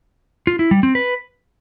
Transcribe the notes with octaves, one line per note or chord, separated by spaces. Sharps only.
F4
E4
G3
C4
B4